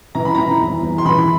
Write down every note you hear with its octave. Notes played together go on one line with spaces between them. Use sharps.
E3 A#5
B5
E3 A#5
E2
E2
C6
E3 B5